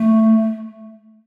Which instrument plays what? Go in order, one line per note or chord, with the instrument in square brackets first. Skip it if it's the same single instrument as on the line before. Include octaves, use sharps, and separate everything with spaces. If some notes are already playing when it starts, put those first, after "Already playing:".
Already playing: [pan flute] A3